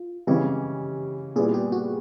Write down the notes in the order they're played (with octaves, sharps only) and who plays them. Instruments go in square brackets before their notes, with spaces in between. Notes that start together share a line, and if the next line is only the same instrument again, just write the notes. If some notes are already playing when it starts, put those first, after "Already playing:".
Already playing: [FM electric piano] F4
[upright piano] C#3 E3 G#3 C#4 E4 [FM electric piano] G4
[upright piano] A#2 G3 B3 E4 [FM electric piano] G#4
[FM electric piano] G4
F#4